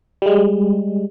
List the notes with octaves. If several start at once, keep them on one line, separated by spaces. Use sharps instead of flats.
G3 G#3